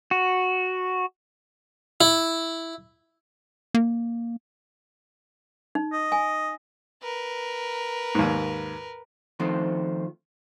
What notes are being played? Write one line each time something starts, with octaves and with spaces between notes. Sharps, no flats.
F#4
E4
A#3
D#4
D#5
G#5
A#4 B4
D#2 G#2
D#3 F3 A3 C4